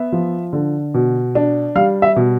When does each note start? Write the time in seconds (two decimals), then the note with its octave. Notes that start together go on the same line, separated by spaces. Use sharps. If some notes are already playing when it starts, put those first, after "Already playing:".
Already playing: B3 E5
0.12 F3
0.53 D3
0.94 B2
1.35 D4
1.75 G3 F5
2.02 E5
2.16 B2